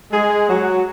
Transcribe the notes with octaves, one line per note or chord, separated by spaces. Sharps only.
G#3 G#4
F#3 F#4